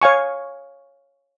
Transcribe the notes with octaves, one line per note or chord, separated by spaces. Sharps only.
C#5 F5 G#5 C#6